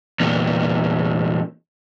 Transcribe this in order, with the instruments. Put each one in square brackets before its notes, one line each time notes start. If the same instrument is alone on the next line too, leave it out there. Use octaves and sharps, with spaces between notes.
[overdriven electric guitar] E2 A#2